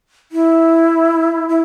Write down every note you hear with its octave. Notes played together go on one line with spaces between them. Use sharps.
E4
E4